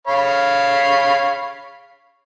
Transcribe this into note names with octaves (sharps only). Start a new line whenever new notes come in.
C#5 F5 B5